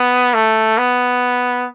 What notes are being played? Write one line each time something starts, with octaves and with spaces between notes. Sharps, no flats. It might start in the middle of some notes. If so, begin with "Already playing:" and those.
Already playing: B3
A3
B3